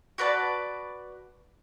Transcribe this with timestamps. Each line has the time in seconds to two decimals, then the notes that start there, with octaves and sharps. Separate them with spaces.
0.18 F#4 B4 D5 A5